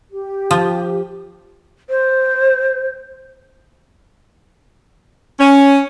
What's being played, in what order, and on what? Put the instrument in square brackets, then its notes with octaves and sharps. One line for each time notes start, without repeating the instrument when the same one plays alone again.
[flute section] G4
[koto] F3
[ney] C5
[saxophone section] C#4